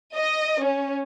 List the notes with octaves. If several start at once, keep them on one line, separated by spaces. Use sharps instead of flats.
D#5
C#4